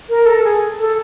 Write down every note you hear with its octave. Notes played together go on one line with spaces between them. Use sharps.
A#4
A4
G#4
A4